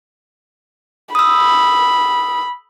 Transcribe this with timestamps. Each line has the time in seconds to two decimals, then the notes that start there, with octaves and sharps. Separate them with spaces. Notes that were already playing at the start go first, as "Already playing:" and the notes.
1.15 B5 D#6 E6